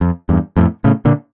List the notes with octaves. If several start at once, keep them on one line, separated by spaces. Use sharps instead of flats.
F2
E2 G2
F2 A2
A2 C#3
A#2 D3